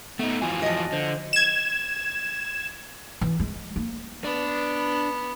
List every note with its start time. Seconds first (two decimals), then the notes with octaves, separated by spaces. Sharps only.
0.19 A3 B3 D#4
0.42 F2 E3 F4 F#4 G#5
0.62 F3 D#5
0.92 D3 C5
1.33 G#6 E7
3.21 E3
3.40 G#3
3.76 A#3
4.24 B3 D4